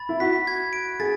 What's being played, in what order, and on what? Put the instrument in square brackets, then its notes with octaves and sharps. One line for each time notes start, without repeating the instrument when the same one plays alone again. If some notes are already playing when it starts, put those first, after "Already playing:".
Already playing: [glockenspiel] B5 A6
[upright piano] E4
[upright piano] F#4 [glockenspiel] B6
[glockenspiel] G#6
D7
[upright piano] G#4 [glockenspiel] A6